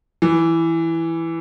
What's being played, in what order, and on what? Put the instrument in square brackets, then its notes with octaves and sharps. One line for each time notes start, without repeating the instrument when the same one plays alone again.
[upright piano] E3